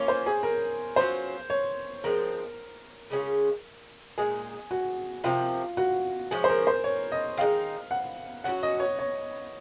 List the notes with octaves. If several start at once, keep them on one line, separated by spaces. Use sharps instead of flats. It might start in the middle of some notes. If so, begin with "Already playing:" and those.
Already playing: A#3 C#4 F4 C#5
C5
G#4
A#4
F#3 C#4 F4 C5
C#5
F3 G#3 C4 D#4 A#4
C#3 G#3 C#4 F4
A#2 G#3 D#4 G#4
F#4
C3 F3 A#3 F4
F#4
F3 G#3 C#4 G#4
C5
A#4
C5
C#5
D#5
D#3 G#3 D#4 F5
F#5
F#3 C#4 F#4 F#5
D#5
C#5
C#5